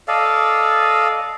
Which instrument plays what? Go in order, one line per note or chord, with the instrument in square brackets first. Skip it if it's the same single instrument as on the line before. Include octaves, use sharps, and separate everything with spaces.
[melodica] A4 D5 D#5 F5